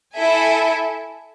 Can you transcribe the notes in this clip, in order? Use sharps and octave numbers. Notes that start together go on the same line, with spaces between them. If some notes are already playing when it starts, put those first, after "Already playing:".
E4 A4 E5 G#5